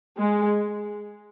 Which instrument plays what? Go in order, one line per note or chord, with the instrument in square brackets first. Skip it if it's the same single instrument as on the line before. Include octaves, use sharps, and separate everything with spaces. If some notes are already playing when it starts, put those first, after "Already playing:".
[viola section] G#3